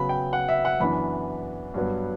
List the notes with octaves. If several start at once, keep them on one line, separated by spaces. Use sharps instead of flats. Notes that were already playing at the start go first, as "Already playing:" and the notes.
Already playing: C#3 F#3 B3 B5
G5
F#5
E5
F#5
F#2 E3 B3 D4 B5
G2 F#3 B3